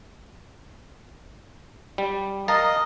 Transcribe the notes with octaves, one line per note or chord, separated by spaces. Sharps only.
G3
A#4 D#5 F5 A5